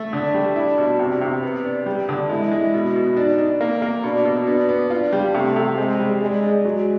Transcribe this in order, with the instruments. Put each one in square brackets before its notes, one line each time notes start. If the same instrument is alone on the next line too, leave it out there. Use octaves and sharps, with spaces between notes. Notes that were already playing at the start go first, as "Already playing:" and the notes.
Already playing: [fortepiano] A3
[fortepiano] D3 [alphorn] D4
[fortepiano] G3
E4
B2
C3
C3
B3
D4
G3
D3
[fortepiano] G#3 [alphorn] E4
[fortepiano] G#3
B2
B2
[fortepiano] D4 [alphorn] D#4
[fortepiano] D4
A#3
A#3
[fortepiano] B2 [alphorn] D4
[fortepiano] B2
[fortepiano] B3 [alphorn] D4
[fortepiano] B3
[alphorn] D4 [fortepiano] F4
[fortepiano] G3
[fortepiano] C3 [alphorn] A3
[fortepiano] C3
[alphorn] G#3 [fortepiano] C4
[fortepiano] G3
[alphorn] G#3 [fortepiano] D4
[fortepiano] D4
[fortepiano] F#3 [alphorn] G#3